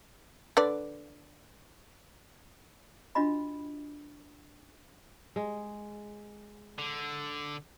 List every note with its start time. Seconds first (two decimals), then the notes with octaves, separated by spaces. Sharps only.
0.57 D3 B4 D5
3.15 D4 F4 F#4 D#5 B5
5.36 G#3
6.78 D3